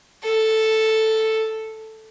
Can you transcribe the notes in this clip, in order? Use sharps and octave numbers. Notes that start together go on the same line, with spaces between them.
A4